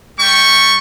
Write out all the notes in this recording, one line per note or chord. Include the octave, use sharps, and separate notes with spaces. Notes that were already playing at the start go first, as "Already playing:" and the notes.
G3 G5 C#6